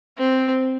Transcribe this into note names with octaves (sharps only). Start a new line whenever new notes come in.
C4